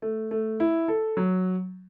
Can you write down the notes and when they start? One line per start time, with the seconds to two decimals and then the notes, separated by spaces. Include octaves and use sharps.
0.02 A3
0.31 A3
0.60 E4
0.88 A4
1.17 F#3